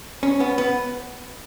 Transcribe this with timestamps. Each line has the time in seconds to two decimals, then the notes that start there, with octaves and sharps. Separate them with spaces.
0.23 C#4
0.40 B3
0.58 B3